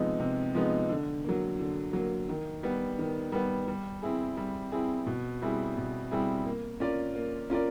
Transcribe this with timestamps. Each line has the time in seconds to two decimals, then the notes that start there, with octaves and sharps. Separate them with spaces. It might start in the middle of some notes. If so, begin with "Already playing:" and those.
Already playing: C3 F3 G#3 B3 D#4
0.19 C3
0.54 F3 G#3 B3 D#4
0.89 D3
1.24 F#3 A#3
1.59 D3
1.93 F#3 A#3
2.29 D#3
2.63 G3 B3
2.99 D#3
3.32 G3 B3
3.68 G3
4.02 C4 E4 G#4
4.37 G3
4.72 C4 E4 G#4
5.06 B2
5.42 G3 C4 E4 G#4
5.77 B2
6.11 G3 C4 E4 G#4
6.46 A#3
6.80 C#4 F4 A#4 D5
7.15 A#3
7.50 C#4 F4 A#4 D5